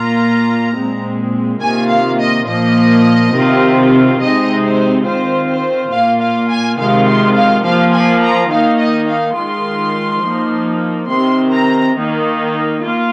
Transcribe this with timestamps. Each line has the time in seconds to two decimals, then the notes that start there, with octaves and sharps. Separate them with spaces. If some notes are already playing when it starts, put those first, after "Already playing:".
Already playing: A#2 A#3 F4 A#5
0.75 A#2 G#3 C4
1.61 C3 D#3 A#3 F4 G#5
1.90 F5
2.19 D#5
2.47 A#2 F3 A#3 D#5
3.34 C3 D#3 C4 F4
4.20 C3 G#3 C4 D#4 D#5
4.64 C5
5.06 D#3 C4 F4 C5
5.50 C5
5.92 A#2 A#3 F4 F5
6.21 F5
6.50 G#5
6.78 C3 D#3 G#3 F4 F5
7.07 C6
7.36 F5
7.64 F3 A#3 F4 F5
7.93 G#5
8.22 A#5
8.51 D#3 A#3 D#4 F5
8.80 D#5
9.08 F5
9.36 D#3 G#3 F4 C6
10.23 F3 A#3 D#4
11.09 C3 D#3 C4 C6
11.52 A#5
11.96 D#3 A#3 D#4
12.82 A#3 F4